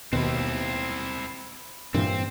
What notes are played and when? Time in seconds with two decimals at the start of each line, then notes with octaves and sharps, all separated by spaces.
0.13 D#2 B2 C4 E4
1.94 G2 A#2 E3 C4